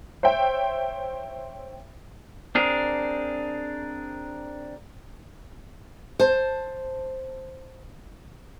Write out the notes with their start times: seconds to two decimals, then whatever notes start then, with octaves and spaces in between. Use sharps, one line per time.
0.23 C5 C#5 E5 G5
2.55 C4 D4 G#4 A#4
6.20 C5 A5